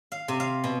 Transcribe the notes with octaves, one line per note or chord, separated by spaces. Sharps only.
F5
C3
F5
B2